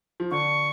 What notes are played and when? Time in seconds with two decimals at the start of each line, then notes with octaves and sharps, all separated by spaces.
0.20 F3
0.31 D3 C#6